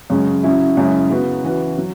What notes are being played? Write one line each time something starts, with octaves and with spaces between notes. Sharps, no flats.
F#2 C#3 G#3 C#4
C#3 F#3 C#4 E4
F#2 C#3 G#3 C#4 E4
C#3 F#3 B3 F#4 B4
E3 C#4 F#4 B4
F#3